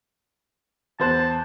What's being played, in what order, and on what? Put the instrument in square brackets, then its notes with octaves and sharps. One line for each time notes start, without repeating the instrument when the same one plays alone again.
[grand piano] E2 C5 F#6 [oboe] A5